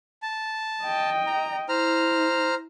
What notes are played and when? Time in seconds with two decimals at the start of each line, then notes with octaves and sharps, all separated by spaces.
0.23 A5
0.85 D#5 G5
1.27 A#5
1.69 E4 C5 A#5 F6